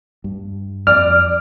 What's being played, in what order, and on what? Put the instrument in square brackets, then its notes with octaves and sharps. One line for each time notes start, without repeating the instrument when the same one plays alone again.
[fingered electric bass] G2
[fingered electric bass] F2 [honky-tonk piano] D5 [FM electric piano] F6